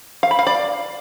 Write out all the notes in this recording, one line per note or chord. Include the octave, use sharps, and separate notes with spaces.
F5
B5
F5
D5